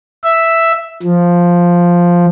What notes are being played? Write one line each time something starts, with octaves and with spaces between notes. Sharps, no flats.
E5
F3